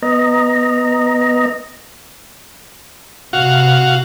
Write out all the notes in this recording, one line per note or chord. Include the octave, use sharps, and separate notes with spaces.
B3 D#5 A#5
C3 F#4 F5